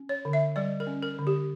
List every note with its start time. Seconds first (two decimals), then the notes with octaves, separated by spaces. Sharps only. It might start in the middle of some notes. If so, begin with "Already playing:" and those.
Already playing: C#4
0.09 C#5
0.25 D3
0.33 E5
0.56 G3 D5
0.80 A#4
0.87 C#4
1.03 A#4
1.19 D3
1.27 G4